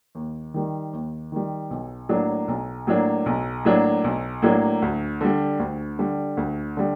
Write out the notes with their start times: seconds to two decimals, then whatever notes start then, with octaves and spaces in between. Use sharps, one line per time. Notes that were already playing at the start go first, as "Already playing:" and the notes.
0.15 D#2
0.54 D#3 G3
0.93 D#2
1.32 D#3 G3
1.70 B1
2.09 A2 F#3 A#3 D4
2.48 B1
2.87 A2 F#3 A#3 D4
3.26 B1
3.65 A2 F#3 A#3 D4
4.04 B1
4.42 A2 F#3 A#3 D4
4.82 D2
5.21 D3 G3
5.59 D2
5.99 D3 G3
6.37 D2
6.77 D3 G3